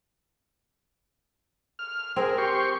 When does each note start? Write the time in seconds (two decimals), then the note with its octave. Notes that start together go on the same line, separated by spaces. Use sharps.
1.79 F6
2.16 C4 G#4 A#4
2.38 G4 C6 C#6